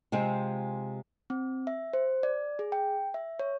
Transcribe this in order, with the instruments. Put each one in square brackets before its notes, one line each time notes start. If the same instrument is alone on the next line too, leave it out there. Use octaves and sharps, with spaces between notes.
[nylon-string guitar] C3 G#3 C4 F4
[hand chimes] C4
E5
C5
D5
G#4
G5
E5
C#5